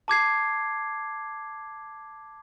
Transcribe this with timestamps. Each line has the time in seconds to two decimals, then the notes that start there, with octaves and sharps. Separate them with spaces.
0.08 A5 D6 G#6 C7